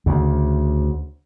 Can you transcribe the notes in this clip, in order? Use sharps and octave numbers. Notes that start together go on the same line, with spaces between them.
D2 C#3